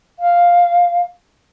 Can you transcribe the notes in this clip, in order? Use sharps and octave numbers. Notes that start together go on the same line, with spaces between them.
F5